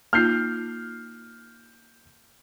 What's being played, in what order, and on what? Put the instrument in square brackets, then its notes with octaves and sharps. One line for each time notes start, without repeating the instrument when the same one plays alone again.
[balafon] A#3 D#4 F4 [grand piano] F6 G6 C7